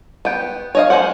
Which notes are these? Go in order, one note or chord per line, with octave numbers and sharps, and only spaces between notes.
B3 G5
C#5 D#5 F5
G#3 A#3 C#4 C5 F#5